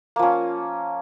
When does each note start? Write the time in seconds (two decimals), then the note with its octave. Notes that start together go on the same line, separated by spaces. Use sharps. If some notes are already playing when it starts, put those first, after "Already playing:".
0.16 A#3
0.19 F3
0.23 C#4